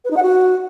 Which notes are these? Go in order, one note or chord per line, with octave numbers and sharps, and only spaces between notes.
B4
D#4
F#5
F#4